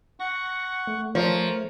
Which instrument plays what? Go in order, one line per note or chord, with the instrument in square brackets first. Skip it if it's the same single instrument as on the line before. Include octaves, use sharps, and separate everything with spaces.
[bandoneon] F#5 C#6 [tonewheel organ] A#6
[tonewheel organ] A3
[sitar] F3 [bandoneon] A#4 [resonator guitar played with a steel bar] C#5